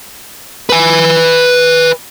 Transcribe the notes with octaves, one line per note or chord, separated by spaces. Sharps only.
B4 G#5